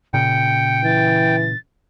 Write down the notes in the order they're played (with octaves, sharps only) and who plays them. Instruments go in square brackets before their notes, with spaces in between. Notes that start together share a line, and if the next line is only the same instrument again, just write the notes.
[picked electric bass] A#2 C#3 [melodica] G5 [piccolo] C#7
[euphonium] E3 [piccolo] A6